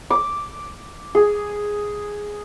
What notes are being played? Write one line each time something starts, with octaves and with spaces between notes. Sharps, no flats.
D6
G#4